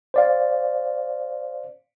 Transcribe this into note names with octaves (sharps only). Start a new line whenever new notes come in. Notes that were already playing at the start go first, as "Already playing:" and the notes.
C5 D5 F5